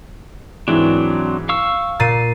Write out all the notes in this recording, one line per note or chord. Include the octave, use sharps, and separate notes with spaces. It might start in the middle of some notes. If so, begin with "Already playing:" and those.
G#2 E3 F#3 C4 D4
F5 C#6 E6
A#2 A6 C7 D#7